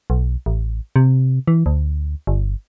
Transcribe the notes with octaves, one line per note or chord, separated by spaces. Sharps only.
B1
A1
C3
E3
D2
G1